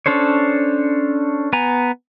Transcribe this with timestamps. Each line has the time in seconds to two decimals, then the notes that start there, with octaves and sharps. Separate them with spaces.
0.06 C#4 D4 A4 C5 C#5
1.53 B3 G#5 A#5